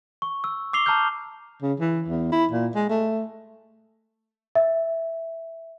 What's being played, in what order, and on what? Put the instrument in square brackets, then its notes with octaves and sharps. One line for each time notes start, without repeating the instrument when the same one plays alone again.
[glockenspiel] C#6
E6
D6 E6 C7 F7 G7
A5 A#5 E6 F6 G6
[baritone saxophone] C#3
E3
E2
E4
A#2
G#3
A3
[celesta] E5